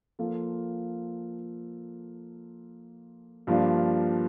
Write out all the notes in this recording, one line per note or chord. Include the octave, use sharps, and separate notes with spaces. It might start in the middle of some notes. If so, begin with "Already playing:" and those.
F3 A#3 F4 A4
G2 F3 A#3 D4 F4